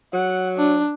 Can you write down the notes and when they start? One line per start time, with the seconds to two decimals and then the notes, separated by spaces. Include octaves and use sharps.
0.14 F#3 F#5
0.57 D4